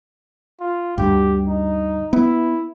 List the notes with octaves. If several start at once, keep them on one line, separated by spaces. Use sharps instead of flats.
F4
D2 G2 G4
D#4
B3 E4